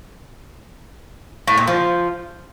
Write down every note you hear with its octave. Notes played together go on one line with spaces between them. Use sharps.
A2
A#2
F3